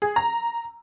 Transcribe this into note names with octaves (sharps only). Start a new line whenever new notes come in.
G#4
A#5